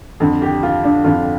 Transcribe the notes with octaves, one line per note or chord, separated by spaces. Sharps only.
F2 D3
G4
F4
D4
F2 D3 F4